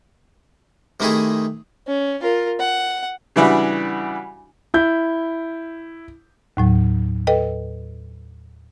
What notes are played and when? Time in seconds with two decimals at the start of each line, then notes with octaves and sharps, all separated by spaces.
1.00 C3 D#3 A3 D#4 E4 G#4
1.88 C#4
2.22 F4 A#4
2.60 F#5
3.36 C#3 E3 G3 D4 E4 F#4
4.74 E4 G6
6.57 D#2 A2 F#3
7.27 A4 B4 D#5 G5